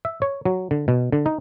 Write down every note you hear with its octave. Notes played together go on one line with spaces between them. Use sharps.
E5
C#5
F#3
D3
B2
D3
D#4